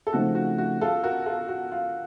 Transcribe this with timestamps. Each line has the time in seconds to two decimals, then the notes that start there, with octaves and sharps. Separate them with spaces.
0.07 A4
0.13 C#3 F3 A3 C4 D#4 F#4
0.35 F#4
0.58 F#4
0.81 F4 A4
1.03 F#4 A#4
1.26 F4 A4
1.48 F#4
1.71 F4